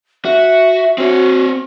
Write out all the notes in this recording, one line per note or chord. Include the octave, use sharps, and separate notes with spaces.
F#4 E5
C4 F#4 C#5